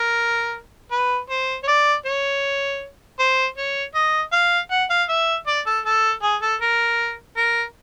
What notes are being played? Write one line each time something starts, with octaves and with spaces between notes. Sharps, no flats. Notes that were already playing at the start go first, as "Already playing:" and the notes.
Already playing: A#4
B4
C5
C#5
D5
C#5
C5
C#5
D#5
F5
F#5
F5
E5
D5
A4
A4
G#4
A4
A#4
A#4